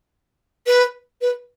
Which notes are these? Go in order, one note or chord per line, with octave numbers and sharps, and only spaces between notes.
B4
B4